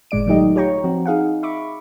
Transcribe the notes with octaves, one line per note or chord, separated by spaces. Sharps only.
G1 A2 G#3 D5 D7
D#3 F#3 A3 D#4 G4 D#5
F4 G4 C#5 G5 A#5 C#6
F3 C4 F#4
D#4 G#4 F5 F#5
E5 B5 C#6 D6